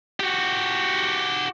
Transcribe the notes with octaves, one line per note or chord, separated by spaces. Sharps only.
F#4 G4